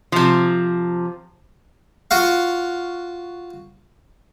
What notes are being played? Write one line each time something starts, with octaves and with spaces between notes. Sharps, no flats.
C3 F3
F4 F#4 F5